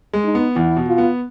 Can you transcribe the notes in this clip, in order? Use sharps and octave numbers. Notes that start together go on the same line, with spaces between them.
G#3
D#4
B3
E2 E4
B2
F4
B3